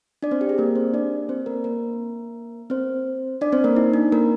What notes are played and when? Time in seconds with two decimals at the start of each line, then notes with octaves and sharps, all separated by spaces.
0.23 D4 D5
0.31 C4 C5
0.41 G4
0.49 G#4
0.58 A#3 A#4
0.76 C4 C5
0.94 D4 D5
1.29 C4 C5
1.46 A#3 A#4
1.64 A#3 A#4
2.70 C4 C5
3.41 D4 D5
3.52 C4 C5
3.64 A#3 A#4
3.76 D#4
3.94 D4
4.12 A#3 A#4